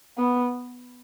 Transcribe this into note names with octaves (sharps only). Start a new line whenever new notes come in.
B3